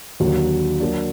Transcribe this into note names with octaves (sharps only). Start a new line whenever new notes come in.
D#2 D3 F#3
F#3 A#3 D4